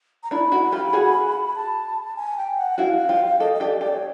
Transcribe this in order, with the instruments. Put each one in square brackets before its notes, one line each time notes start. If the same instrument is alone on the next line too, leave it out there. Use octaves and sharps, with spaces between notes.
[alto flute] A#5
[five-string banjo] D4 E4 [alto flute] B5
[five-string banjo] E4 F#4
F4 G4
F#4 G#4
[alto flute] A5
G#5
G5
F#5
[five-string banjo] E4 F#4 [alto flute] F5
[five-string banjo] F4 G4
[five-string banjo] G4 A4 [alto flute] D#5
[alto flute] D#5
[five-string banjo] G4 A4 [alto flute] D5
[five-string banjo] G4 A4 [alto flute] D5
[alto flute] C#5